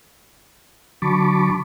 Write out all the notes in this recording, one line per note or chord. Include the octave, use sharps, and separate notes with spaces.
D3 F#3 A5 B5 C#6 D6